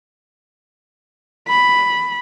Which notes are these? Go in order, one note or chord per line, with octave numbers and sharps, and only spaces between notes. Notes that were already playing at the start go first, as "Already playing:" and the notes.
B5